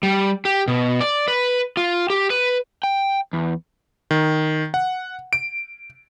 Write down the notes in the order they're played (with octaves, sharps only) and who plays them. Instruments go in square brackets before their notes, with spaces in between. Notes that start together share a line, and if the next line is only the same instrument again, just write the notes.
[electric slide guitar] G3
G4
B2
D5
B4
F4
G4
B4
G5
E2
[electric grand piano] D#3
F#5
D7